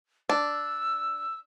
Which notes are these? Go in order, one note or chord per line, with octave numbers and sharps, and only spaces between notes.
D4 E6